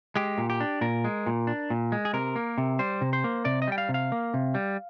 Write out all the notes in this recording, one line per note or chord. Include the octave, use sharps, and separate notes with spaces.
G#3 G4
A#2
G4
D4
A#2 A#4
G#3
A#2
D4
A#2
G#3
G#4
C3 A#4
A#3
C3
G3 C5
C3
C5
A#3
C3 D5
D#5
G3 G5
F5
C3
F5
A#3
C3
G3